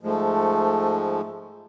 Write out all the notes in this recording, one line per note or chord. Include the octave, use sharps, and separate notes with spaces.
G#2 F3 G#3 A3